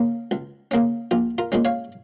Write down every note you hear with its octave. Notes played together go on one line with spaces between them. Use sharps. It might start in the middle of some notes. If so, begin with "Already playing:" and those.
Already playing: C#3 A#3 C#4
C#2
C#3 A#3 C#4
A#1 F4
F4 A#4
A#2 G#3 C#4
C#5 F5